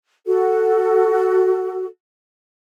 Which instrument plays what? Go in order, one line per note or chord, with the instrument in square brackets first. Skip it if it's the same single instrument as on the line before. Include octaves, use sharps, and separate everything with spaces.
[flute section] F#4 A4